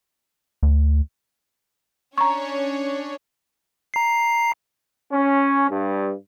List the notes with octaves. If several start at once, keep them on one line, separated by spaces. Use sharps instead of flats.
D2
C#4 D4 C#5 A#5 C#6
A#5 C7
C#4
G2